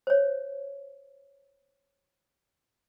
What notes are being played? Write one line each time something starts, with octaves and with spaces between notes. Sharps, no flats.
C5 C#5